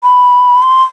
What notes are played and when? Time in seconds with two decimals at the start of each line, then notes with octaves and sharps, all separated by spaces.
0.03 B5
0.62 C6